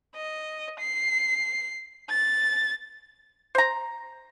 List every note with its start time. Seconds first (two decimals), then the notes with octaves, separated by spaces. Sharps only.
0.16 D#5
0.80 C7
2.09 A6
3.55 C5 A#5